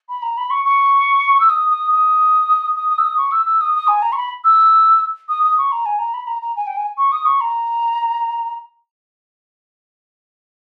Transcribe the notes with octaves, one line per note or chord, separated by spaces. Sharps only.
B5
A#5
B5
C#6
C#6
E6
D#6
D#6
D#6
D#6
D#6
E6
D#6
C#6
E6
E6
D#6
D#6
G#5
A#5
C#6
B5
E6
D#6
D#6
C#6
A#5
G#5
A#5
B5
A#5
A#5
G#5
G5
G#5
C#6
D#6
C#6
A#5